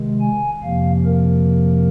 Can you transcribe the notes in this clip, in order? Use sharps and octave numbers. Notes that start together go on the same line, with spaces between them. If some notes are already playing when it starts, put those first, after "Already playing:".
Already playing: C3 D#3 G#3
G#5
F2 C3 F3 A#3 F5
A#4